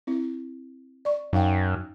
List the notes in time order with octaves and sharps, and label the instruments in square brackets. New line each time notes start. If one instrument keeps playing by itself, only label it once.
[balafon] C4 E4
D5 C#6
[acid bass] F#2 [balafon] D#4 F5 G5